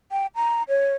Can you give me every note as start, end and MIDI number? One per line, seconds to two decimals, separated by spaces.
0.12 0.27 79
0.35 0.63 82
0.69 0.95 73